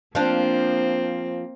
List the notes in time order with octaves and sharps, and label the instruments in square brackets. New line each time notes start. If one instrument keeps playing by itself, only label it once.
[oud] F3 D4 [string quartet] A#3 C4